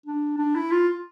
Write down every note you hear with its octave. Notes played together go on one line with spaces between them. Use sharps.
D4
D4
E4
F4